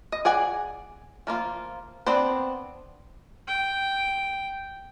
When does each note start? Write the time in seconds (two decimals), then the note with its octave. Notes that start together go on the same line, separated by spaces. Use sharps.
0.12 D#5
0.25 G#4 D5 F#5 G#5
1.27 F3 A#3 F4
2.06 B3 C4 D4 C5
3.48 G5